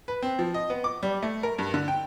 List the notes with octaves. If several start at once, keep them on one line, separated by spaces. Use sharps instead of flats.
B4
C4
F3
D#5
B3
D6
G3
A3
A#4
G2
D3
G5